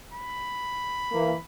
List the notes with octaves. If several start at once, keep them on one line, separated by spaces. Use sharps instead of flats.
B5
E3 A#3